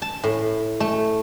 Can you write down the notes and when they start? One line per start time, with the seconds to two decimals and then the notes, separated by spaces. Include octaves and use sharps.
0.02 A5
0.23 A2
0.80 A3